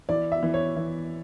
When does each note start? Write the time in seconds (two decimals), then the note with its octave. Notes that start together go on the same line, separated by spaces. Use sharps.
0.09 E3 D5
0.32 E5
0.43 E3
0.54 C#5
0.76 E3